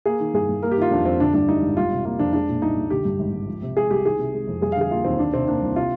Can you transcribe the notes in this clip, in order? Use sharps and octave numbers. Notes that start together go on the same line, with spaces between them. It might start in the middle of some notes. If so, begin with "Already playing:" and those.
A#3 G#4
D#3
G2 G#4
G2
A#3 A#4
G4
D#3 F4
F2 D4
F2 C4
D3 D4
G2 D4
G3 D#4
G#1
G3 F4
C3
A#3 F4
F2 D4
G#3 D4
A#2
C2 D#4
C2
D3 G4
G2
G#1
G#1
F3
C3
G#3 G#4
C2 G4
D#3 G#4
C3
G#3
F2
G3 G#4
F5
D3 G#4
A#3 F4
D#2 C4
D#3 D4
C3 C4
A#3 D4
C2
C3 F4